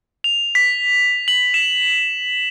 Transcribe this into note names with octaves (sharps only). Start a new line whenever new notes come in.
F7
B6
F#7
E7